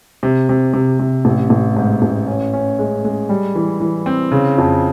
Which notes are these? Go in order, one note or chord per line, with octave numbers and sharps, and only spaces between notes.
C3
C3
C3
C3
A1
A1
G#2
A1
C#4
C#4
G#3
G#3
G3
E3
E3
C4
C#3
F2